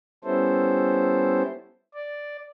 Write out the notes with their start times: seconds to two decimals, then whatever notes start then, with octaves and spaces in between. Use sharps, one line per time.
0.24 G3 B3 C#4 E4 A4 C5
1.94 D5